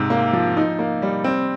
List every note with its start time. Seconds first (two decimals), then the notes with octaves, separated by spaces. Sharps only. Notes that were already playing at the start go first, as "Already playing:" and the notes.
Already playing: G#2 C3
0.10 A#3
0.33 F3
0.57 D#4
0.79 A#3
1.02 G3
1.24 C4